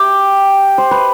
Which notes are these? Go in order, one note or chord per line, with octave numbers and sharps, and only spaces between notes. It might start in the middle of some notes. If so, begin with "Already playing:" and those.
Already playing: G4
C5
B4